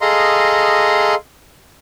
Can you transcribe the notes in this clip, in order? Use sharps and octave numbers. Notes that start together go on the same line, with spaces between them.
G#4 A4 D#5 F5 A#5 C6